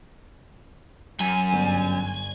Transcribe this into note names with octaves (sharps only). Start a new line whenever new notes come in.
F#2 G#5
G1